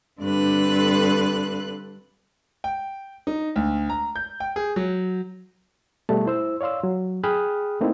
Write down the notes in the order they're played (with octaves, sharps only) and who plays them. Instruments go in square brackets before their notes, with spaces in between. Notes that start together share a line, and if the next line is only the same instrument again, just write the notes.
[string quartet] G2 D3 C4 A4 B4 F#6
[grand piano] G5
D#4
D2
A#5
G6
G5
G#4
F#3
[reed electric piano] B2 G3 A3 A5
E4 C5 E6
C#5 D5 F5 C6 E6
F#3
G#4 G5 B5 D#6 F6 F#6
A3 A#3 C4 D#4 E4